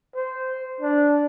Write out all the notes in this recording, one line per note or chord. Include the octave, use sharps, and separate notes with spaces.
C5
D4